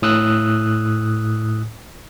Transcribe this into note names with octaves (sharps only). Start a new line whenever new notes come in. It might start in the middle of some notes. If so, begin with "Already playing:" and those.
A2 D#6 E6 F#6